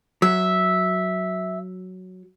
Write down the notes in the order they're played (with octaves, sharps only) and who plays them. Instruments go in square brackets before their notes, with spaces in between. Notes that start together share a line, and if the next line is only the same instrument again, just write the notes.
[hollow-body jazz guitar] F#3 [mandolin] E5